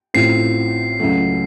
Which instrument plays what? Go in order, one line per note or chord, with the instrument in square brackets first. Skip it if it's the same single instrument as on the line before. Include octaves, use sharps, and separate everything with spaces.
[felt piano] A1 A2 A3 C4 F4 [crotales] C7
[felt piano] C#2 C#3 F#3 A3